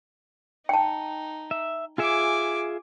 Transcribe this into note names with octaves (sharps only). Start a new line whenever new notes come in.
D#4 G5 A5
E5
F4 G#4 E5 G#5 D6